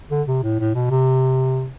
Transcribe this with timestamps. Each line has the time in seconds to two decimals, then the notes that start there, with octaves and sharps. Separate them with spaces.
0.11 D3
0.27 C3
0.43 A2
0.60 A2
0.75 B2
0.91 C3